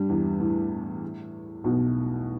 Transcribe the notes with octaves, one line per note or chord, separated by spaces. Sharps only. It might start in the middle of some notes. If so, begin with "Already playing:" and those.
Already playing: G2 G3
E2 E3
A2
B1 B2